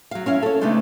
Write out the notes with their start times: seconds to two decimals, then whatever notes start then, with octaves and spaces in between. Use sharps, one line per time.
0.11 F#3 F5
0.26 C#4 E4 F5
0.42 A4 C#5
0.61 C#3 A3 B3 C4 D4 D#4